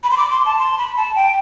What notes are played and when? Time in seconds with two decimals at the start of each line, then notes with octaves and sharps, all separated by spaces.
0.04 B5
0.11 C6
0.17 D6
0.31 C6
0.46 A5
0.59 C6
0.78 B5
0.96 A5
1.16 G5